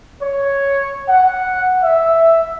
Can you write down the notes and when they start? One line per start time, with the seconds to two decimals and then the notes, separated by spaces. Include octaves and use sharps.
0.22 C#5
1.09 F#5
1.83 E5